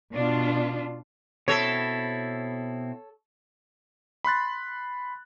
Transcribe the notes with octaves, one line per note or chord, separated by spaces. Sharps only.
B2 D4 F4
B2 C4 E4 A4 C#5
B5 C6 F#6 A6